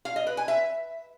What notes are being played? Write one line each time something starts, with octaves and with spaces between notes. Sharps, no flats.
F5
D#5
B4
G#5
E5